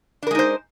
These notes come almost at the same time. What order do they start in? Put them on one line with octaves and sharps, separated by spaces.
D4 A#4 G#3 D#4 C5